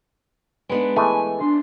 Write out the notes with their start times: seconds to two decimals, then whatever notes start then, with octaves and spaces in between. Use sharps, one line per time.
0.69 G#3 B3 D4 B4
0.96 E3 G#3 A3 G#5
1.40 D4 C6